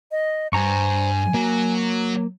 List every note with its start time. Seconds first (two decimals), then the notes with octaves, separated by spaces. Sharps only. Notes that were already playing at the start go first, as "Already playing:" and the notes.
0.11 D#5
0.53 G2 C5 G#5 A#5 C#6
1.34 F#3 A#3